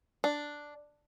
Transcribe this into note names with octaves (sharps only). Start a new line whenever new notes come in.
D4